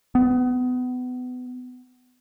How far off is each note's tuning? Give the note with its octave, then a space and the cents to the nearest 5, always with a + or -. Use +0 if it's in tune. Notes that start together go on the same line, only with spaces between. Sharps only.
B3 +25